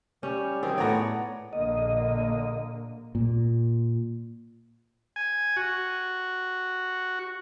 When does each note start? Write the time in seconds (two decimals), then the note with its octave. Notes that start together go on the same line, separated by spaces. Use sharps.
0.23 G3 C#4
0.63 D#3 F#3 C4 G#4 G5
0.78 A2 B3 C#5 D5 F#5 A#5
1.53 A#1 D3 A#3 D#5
3.15 A#2
5.16 G#5
5.56 F#4